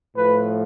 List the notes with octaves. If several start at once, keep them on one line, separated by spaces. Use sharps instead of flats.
A2 F3 A3 B4